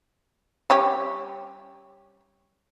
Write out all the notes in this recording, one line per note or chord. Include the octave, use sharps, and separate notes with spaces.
G3 C#4 G4